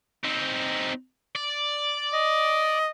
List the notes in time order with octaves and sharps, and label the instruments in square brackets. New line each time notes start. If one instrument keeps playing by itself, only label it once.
[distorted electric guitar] C4 D#4
D5
[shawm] D#5